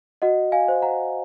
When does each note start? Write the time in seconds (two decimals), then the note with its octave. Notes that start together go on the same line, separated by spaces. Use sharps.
0.22 F#4 D#5 F#5
0.52 F5 G#5
0.68 C5
0.82 F#5 A#5